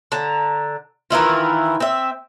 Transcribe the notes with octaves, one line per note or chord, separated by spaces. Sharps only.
D3 A5 A#5
D#3 E3 E4 F4
C4 E5